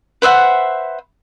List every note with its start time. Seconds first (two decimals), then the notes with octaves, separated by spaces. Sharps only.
0.22 B4 C5 E5 F#5